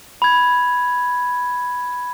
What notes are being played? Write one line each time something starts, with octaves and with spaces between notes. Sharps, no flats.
B5 G#6